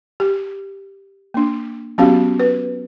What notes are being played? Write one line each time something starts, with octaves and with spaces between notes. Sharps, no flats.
G4
A#3 D4
F#3 B3 C#4 F#4 G4 F5
B4